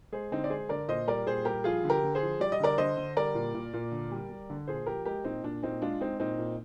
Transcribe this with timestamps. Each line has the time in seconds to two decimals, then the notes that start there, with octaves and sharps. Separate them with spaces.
0.12 G#3 G#4 C5
0.31 D3 C4 D#4
0.44 D5
0.50 G#3 G#4 C5
0.69 D3 A#4 D5
0.88 A#2 C5 D#5
1.07 G3 A#4 D5
1.27 A#2 G#4 C5
1.45 G3 G4 A#4
1.64 F3 F4 G#4
1.84 D3
1.90 G4 A#4
2.03 D3
2.15 G#4 C5
2.22 F3
2.40 G3 D5
2.52 D#5
2.60 D3 A#4 D5
2.78 D3 C5 D#5
2.97 D3
3.17 G3 A#4 D5
3.35 A#2
3.54 A#2
3.73 A#2
3.92 D3
4.11 G3
4.30 G3
4.50 D3
4.68 A#2 G#4 C5
4.86 F3 G4 A#4
5.05 G#3 G4 A#4
5.24 A#2 C4 D#4
5.44 A#2 D4
5.63 A#2 C4 D#4
5.82 G#3 D4 F4
6.00 G#3 C4 D#4
6.19 A#2 C4 D#4
6.38 A#2